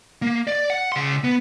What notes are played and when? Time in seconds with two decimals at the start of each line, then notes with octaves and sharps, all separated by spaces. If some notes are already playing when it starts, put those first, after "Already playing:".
0.22 A#3
0.47 D5
0.70 F#5
0.92 C#3 C6
1.24 B3